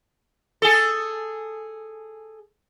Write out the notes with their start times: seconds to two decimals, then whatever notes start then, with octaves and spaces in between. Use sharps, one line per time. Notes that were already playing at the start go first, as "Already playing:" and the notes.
0.62 G#4 A4